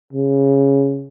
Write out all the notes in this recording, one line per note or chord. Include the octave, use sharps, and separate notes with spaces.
C#3